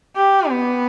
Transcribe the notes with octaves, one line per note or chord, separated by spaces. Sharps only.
G4
B3